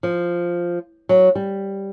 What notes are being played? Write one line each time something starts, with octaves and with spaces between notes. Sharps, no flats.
F3
F#3
G3